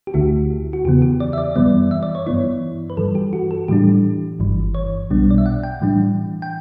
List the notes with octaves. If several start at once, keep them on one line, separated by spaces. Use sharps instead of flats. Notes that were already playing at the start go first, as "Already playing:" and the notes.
G4
D2 D3 A3 E4 F#4
F#4
E2 C#3 E3 B3 G4
G4
D5
E5
D5
F#2 E3 G3 B3 D5
E5
D5
C#5
G2 E3 B3 E4 C#5
B4
G2 E3 G3 A4
G4
F#4
A4
A2 E3 G3 D4 G4
G1 G2 E3
C#5
B1 B2 G3 B3 D4
D5
E5
F#5
G5
A2 E3 G3 D4
G5